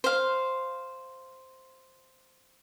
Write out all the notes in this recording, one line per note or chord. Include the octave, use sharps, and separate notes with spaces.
C5 F5